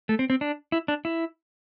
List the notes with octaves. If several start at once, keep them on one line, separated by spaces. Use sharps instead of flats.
A3
C4
C4
D4
E4
D4
E4